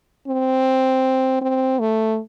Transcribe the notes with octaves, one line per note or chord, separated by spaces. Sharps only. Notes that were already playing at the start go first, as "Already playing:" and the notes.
C4
C4
A3